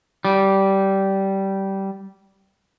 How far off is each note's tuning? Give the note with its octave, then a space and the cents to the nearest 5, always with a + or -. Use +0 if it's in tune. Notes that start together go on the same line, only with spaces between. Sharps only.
G3 -15